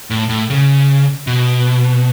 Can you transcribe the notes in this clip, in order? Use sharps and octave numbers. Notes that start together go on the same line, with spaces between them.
A2
A2
C#3
B2